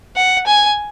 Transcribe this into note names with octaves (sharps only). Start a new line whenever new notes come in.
F#5
G#5